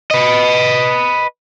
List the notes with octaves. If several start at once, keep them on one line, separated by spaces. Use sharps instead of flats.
B4 D#5